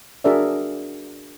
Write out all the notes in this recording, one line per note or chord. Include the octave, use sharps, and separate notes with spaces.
D4 F#4 G#4 A#4 D5 E5